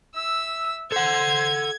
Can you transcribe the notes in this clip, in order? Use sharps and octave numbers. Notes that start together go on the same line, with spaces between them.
E5 E6
A4 C5 F#5 G#6